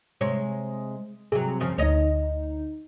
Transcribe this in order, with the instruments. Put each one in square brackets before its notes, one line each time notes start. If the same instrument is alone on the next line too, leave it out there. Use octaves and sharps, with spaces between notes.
[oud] C3 G#3 C#5
[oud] C3 F#3 [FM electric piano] G#4
[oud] F#2 C#3 F3
[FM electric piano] D2 D#4 [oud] C#5 D#5